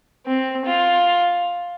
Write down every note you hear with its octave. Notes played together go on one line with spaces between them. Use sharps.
C4
F4